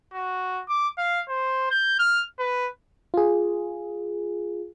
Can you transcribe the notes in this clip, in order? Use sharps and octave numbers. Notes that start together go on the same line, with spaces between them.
F#4
D6
F5
C5
G6
F6
B4
F4 G#4